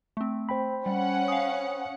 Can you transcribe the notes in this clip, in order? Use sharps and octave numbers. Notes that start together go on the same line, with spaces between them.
A3 C4
C5 G5 B5
G3 C#4 F#5
F5 D#6